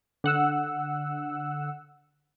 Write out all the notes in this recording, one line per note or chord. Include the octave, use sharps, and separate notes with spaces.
D3 F#5 E6